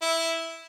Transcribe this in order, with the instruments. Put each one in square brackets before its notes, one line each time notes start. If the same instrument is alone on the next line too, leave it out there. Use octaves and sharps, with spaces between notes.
[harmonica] E4